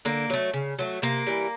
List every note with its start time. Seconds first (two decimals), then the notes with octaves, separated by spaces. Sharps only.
0.05 D3 A#3
0.30 F#3 A3
0.53 C#3
0.79 F#3 A3
1.02 C3 A#3
1.27 E3 G3